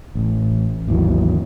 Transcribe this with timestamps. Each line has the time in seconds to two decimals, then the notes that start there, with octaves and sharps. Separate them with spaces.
0.15 A1
0.87 G#1 D#2 E3 F#3